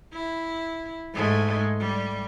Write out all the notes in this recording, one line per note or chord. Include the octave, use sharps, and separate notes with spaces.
E4
G#2 G#3 A3
G3